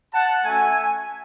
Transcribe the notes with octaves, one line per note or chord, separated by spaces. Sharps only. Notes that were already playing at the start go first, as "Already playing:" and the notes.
F#5 A5
A3 C#4 F#4 E5 G#5